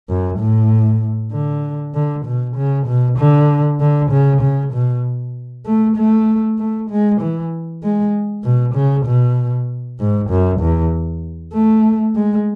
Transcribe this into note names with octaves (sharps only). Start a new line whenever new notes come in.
F#2
A2
D3
D3
B2
C#3
B2
D3
D3
C#3
C#3
B2
A3
A3
A3
G#3
E3
G#3
B2
C#3
B2
G#2
F#2
E2
A3
G#3